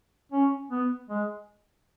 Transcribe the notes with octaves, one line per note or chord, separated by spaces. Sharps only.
C#4
B3
G#3